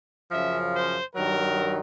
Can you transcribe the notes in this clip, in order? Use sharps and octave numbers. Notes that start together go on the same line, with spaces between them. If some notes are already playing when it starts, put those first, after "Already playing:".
F#2 C#3 F3 E5
C5
G2 D#3 F#3 A#4